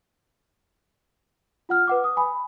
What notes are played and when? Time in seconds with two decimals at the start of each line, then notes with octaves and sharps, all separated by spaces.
1.69 F4 F#5 F6
1.87 B4 F#5 D6
2.04 D#6
2.17 G#5 B5